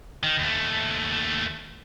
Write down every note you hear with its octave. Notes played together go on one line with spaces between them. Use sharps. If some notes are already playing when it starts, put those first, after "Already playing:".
D#3
D#2 A3